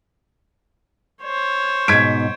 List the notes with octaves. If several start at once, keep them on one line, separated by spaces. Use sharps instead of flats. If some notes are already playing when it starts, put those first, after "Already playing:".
C5 C#5
G#2 B2 G#6 B6 D7